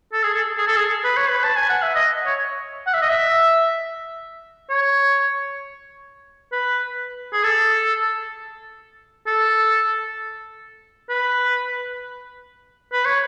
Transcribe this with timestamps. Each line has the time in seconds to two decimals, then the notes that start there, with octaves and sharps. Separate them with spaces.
0.12 A4
0.23 G#4
0.34 A4
0.57 G#4
0.67 A4
0.76 G#4
1.04 B4
1.17 C#5
1.29 B4
1.43 A5
1.56 G#5
1.69 F#5
1.83 E5
1.95 D#5
2.26 C#5
2.86 F#5
2.94 E5
3.02 D#5
3.09 E5
4.70 C#5
6.52 B4
7.33 G#4
7.43 A4
9.27 A4
11.09 B4
12.92 B4
13.05 C#5